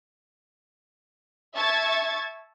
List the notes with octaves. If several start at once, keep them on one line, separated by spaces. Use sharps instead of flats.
E5 A5 C#6 G#6 A6